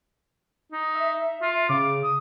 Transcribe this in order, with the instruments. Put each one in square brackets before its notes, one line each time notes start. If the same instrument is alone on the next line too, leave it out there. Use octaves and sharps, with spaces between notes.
[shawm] D#4
[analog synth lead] E5
[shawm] F4
[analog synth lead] C#3 [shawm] D6
[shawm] D#6